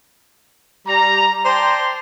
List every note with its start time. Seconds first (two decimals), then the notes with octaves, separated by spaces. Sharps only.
0.87 G3 A#5
1.45 C5 D5 G5 A5 A#5 C6